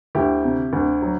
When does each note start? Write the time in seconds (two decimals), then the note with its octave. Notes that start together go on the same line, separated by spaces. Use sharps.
0.15 D2 E4 G4
0.44 C3
0.73 D2
1.02 F#3